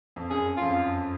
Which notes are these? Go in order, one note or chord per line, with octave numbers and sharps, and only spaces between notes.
F2
F#2 G#4
F2 F4
F#2